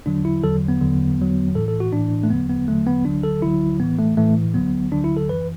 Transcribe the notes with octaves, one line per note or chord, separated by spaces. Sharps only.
E2 D3 F#3 D4
E4
E2 D3 F#3 A4
B3
E2 D3 F#3
E2 D3 F#3
A2 E3 A4
A4
F#4
A2 E3 D4
A3
E2 D3 F#3 B3
B3
E2 D3 F#3 A3
B3
D2 D3 F#3 D4
A4
D2 D3 F#3 E4
A2 E3 B3
A3
A2 E3 A3
D2 D3 F#3 B3
D2 D3 F#3 D4
E4
A4
F#2 E3 B4